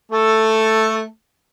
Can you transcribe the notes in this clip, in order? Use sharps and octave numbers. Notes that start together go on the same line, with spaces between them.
A3 A4